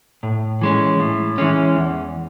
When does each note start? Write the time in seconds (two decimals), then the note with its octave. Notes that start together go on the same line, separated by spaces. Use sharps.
0.23 A2
0.61 E3 G#3 C#4
0.99 A2
1.38 E3 G#3 C#4
1.76 E2